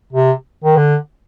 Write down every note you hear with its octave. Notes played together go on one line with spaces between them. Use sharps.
C3
D#3
D3